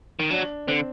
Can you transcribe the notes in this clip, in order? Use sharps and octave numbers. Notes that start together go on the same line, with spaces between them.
D#3
F#3 D4
D3 C4